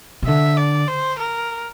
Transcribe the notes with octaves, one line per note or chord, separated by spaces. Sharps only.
C3
D3 E5
D5
C5
A#4